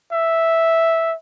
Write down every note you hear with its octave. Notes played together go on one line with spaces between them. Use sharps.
E5